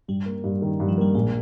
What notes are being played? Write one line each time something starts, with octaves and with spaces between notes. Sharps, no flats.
G2 G3
A#3
G2
D#3
G2
F3
G3 A#3
A#1 G#3